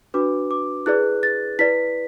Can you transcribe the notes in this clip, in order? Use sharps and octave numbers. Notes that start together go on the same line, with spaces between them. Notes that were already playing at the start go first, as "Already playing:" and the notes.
D4 F#4 B4 D6
D6
E4 G#4 B4 D5 F#6
A6
E4 B4 D5 B6